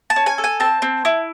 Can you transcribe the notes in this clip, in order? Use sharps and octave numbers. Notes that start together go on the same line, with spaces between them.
A5
C#4
G#5
A4
G#5
C4 A5
C4
E4